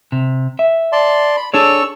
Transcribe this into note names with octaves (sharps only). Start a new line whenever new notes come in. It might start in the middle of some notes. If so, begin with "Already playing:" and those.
C3
E5
D5 A5 C6
B5
D4 G#4 A4 C#5 C#6 E6